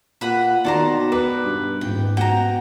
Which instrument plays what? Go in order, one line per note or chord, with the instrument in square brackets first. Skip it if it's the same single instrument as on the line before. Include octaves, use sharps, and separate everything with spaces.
[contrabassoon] A#2 [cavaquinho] B4 F#5 B5
[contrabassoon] B2 [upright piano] D#3 D5 [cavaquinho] A4 C5 A#5
[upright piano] B3 D6 [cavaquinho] B4
[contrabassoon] G2
[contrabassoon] D#1 [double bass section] G#2 [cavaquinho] G5
[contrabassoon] B2 [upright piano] F#5 [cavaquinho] G5 A#5